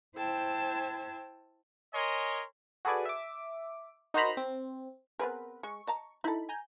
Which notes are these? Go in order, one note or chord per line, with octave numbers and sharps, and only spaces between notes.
E4 C5 G5 A5 E6 G#6
A#4 C#5 D#5 G#5 C6
F#4 G#4 A4 B4 D5 G#5
E5 D6
D#4 F#4 A#4 C5 A#5 B5
C4
B3 C4 G#4 A#4 B4
G#3 C#6
D#5 A5 A#5
D#4 E4 A4 B5
G#5 A#5 G6